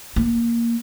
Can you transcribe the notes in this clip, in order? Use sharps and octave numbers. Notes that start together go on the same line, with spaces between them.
A#3